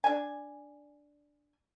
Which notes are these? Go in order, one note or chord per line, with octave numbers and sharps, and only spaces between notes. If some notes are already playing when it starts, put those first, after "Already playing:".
D4 G#5